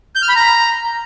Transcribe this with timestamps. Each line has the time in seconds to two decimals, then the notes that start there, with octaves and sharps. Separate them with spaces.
0.15 G6
0.22 F6
0.29 B5
0.36 A#5